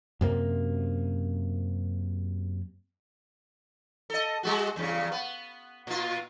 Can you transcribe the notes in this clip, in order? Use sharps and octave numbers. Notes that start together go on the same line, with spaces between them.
F#2 C3 A#3
A4 D#5
G3 G#3 F#4
E2 G2 C#3
B3
A#2 F4